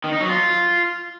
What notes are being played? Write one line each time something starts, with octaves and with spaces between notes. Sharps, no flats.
D#3
D#4
F#3
F4